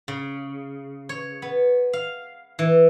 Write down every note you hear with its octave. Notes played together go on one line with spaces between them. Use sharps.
C#3
C#5
B3
F5
E3